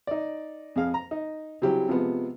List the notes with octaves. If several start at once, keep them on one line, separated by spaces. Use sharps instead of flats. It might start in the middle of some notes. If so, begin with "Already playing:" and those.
D#4 D5
F2 G#4 F5
A#5
D#4
C#3 F#3 G3 C4 E4 G4
C3 F3 G#3 B3